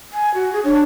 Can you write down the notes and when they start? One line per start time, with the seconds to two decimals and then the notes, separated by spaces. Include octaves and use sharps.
0.13 G#5
0.34 F#4
0.53 G#4
0.65 D4 C#5